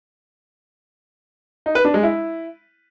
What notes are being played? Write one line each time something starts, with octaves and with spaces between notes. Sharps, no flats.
D#4
B4
D4
G#3
E4